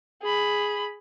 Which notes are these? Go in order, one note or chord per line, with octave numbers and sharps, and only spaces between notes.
G#4 B5